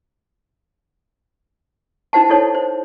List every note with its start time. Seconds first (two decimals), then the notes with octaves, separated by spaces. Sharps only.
2.13 D#4 E4 C5 F#5 A5
2.30 D#4 E4 A4 C5 C#5
2.55 C5